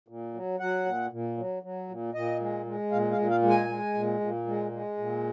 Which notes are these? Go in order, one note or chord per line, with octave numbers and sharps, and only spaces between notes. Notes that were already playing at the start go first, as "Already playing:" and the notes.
A#2
F#3
F#3 F#5
A#2
A#2
F#3
F#3
A#2
A#2 D#5
G#3
G#3
A#2 F5
F5
A#2
F5
G#3
G#5
G#3
A#2
A#2
G#3
G#3
A#2